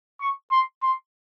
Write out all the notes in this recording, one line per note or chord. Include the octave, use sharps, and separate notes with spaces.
C#6
C6
C6